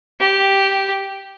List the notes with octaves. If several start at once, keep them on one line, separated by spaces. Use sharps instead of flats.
G4